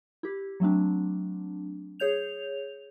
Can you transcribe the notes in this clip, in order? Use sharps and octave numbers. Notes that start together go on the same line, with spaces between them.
E4 G4
F#3 A3 C4 D4
G#4 C#5 G6 F7